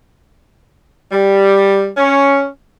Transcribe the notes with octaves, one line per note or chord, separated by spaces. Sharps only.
G3
C#4